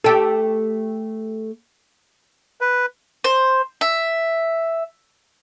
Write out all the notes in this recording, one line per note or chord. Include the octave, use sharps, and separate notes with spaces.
A3 G4 A4
B4
C5
E5